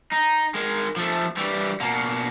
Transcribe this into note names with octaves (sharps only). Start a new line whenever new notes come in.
D#4
D#3 G#3
F3 A3
E3 G3
B2 A#3